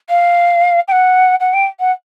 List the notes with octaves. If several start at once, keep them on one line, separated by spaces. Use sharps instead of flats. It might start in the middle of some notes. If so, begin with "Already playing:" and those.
F5
G5
F#5
F#5
G5
F#5